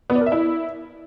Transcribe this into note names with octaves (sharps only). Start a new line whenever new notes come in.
B3
D5
A#4
E5
E4